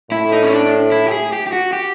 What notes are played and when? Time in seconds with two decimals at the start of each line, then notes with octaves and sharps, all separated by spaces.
0.11 A2 E4
0.32 D#4
0.43 C#4
0.52 D4
0.92 E4
1.08 G4
1.12 G#4
1.33 G4
1.47 G4
1.53 F#4
1.73 G4